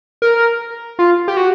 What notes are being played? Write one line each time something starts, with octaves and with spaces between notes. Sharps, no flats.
A#4
F4
G4
F#4